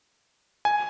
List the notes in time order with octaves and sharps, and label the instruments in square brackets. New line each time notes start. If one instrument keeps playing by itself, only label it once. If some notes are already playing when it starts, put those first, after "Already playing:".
[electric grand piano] G#5